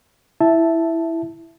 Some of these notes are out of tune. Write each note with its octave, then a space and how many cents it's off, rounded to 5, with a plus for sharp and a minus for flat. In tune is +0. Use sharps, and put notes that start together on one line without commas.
E4 +0 E5 +0 A5 +0